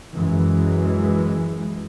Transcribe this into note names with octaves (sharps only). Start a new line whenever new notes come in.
F#2 E3 G#3